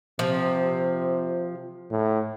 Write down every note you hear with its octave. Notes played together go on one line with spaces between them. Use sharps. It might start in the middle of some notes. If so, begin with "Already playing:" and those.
C3 F3
A2